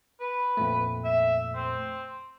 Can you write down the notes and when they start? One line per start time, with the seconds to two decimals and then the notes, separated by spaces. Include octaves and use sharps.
0.21 B4
0.57 F2 A#2 A3
1.04 E5
1.55 C4